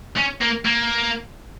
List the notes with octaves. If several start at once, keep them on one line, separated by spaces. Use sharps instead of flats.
C#4
A#3
A#3